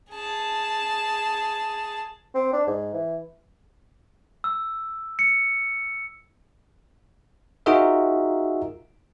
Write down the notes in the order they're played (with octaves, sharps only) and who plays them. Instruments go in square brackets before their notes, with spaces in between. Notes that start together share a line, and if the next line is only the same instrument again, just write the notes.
[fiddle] G#4 A5
[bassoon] C4
D4
G#2
E3
[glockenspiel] E6
C#7
[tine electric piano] D#4 F4 F#4 G#4 A#4 E5